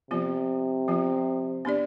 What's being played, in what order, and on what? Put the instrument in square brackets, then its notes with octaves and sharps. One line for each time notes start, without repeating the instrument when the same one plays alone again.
[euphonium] C3 [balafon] F3 B3 F4
[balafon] F3 B3 F4
B3 D4 G4 D5